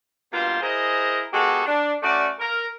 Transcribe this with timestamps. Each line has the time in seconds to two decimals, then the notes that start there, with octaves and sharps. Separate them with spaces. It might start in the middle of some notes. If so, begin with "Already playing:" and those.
0.31 G2 B2 A#3 F4 C5
0.61 E4 G#4 A#4 C5 D#5
1.32 G#3 B3 F#4 G4 A4
1.66 D4
2.03 A3 C#4 F#4 D5
2.39 A#4